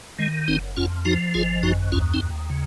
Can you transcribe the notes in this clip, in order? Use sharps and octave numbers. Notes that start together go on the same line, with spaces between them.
D#3 G#3
F#1 C4 D#4
F2 C#4 F4
F3 D#4 F#4
G#1 F4 G#4
F#2 D#4 F#4
D#2 C#4 F4
C4 D#4
D#2
C#3